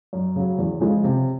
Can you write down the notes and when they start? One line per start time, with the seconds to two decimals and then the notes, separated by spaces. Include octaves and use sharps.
0.13 F#2
0.36 C#3 F#3
0.59 E2
0.80 C#3 F3 G#3
1.04 C3